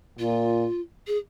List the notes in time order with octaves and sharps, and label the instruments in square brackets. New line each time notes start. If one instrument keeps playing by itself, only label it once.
[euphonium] A#2 [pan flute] F4
[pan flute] G#4